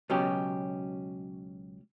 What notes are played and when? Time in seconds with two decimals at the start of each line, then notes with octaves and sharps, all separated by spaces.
0.10 C#2 B2 F#3 C#4 G4